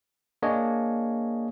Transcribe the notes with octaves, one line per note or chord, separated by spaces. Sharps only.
A#3 D4 G#4 C#5 D#5